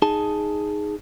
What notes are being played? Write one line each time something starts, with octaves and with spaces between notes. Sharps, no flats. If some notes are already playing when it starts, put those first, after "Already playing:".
D#4 G#4 A5